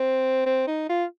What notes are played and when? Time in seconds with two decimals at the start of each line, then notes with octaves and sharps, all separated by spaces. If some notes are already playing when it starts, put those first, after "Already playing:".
Already playing: C4
0.46 C4
0.67 D#4
0.89 F4